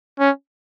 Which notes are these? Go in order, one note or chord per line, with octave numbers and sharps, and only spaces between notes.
C#4